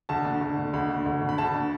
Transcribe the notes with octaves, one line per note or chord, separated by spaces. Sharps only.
D2 A5
D3
D2
D3
D2 B5
D3
D2
D3
B5
D2 A5
D3